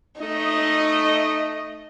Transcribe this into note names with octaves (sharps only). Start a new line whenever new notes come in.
A3 D#4 D#5